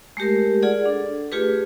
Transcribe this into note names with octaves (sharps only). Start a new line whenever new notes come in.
G#3 A3 G4 A#4
F4 G#4 D5 F#5
D4 A4
A3 F4 G4 G#4 B4